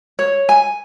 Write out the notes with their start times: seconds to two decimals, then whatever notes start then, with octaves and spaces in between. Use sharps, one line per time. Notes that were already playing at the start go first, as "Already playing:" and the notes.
0.19 C#5
0.49 G#5